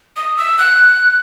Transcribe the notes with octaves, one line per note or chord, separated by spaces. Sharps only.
D#6
E6
F#6